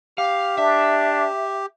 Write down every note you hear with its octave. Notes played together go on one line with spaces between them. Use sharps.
G4 F5
D4 E5